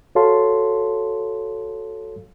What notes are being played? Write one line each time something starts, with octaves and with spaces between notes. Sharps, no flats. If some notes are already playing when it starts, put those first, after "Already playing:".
F#4 A4 C#5 F5 A5 C6